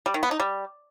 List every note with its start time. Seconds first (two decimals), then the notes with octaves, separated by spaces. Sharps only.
0.06 G3
0.14 D#3
0.23 B3
0.31 D#4
0.40 G3